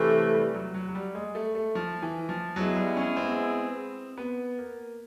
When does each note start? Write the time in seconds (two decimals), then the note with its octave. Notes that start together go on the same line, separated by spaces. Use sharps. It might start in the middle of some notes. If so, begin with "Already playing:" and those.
Already playing: C3 E3 A3
0.35 G3
0.54 F#3
0.74 F#3
0.88 F#3
0.95 G3
1.15 G#3
1.35 A3
1.55 A3
1.75 F3
2.02 E3
2.29 F3
2.56 F#3 G#3 B3 E4 G#4
2.76 G3
2.97 C#4
3.17 C4
4.18 B3
4.58 A#3